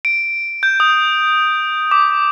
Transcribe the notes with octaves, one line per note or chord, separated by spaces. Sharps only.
D7
G6
D#6
D6